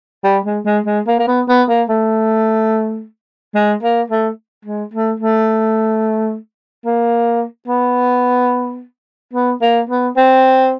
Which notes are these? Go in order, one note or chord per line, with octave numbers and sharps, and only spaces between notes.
G3
G#3
G#3
G#3
A#3
A#3
B3
B3
A#3
A3
G#3
A#3
A3
G#3
A3
A3
A#3
B3
B3
A#3
B3
C4